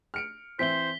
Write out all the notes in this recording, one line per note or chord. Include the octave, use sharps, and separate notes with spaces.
F6 C#7 D7
E3 C4 C5 E5 B6 G7